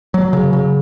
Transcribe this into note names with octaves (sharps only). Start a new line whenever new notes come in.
F#3
C#3
C#3